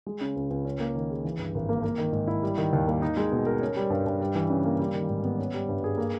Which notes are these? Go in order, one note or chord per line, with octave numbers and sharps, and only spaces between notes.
G#3
C#3
C#2
C#2
C#4
A#3
D#3
G#4
E3
G2
G#1
A#3
A#3
D#3
G#2
E4
G3
D#3
D#2
A#3
D#4
G#3
B2
A#4
C#4
G3
G2
G2
G3
E3
C#3
A#3
G3
D#3
G#2
B3
C#4
G3
G2
G#4
A#3